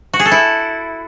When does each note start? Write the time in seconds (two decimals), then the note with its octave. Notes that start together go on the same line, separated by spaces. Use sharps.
0.14 F#4
0.20 G#4
0.26 A4
0.32 E4